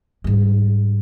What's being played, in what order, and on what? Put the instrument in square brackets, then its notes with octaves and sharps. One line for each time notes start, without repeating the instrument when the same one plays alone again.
[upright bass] G#2 G3